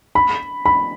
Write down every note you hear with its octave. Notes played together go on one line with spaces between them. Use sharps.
B5
B5